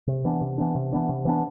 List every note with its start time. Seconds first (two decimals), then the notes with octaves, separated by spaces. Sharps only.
0.07 C3
0.25 E3 B3 D4
0.41 C3
0.58 E3 B3 D4
0.75 C3
0.93 E3 B3 D4
1.09 C3
1.25 E3 B3 D4